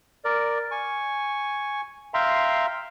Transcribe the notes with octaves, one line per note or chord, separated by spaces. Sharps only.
A#4 D5
G#5 C#6
E5 F5 G5 A#5 C6